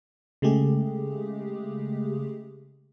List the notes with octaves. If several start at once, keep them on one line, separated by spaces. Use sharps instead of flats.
C#3 G#3 A3 G4 G#4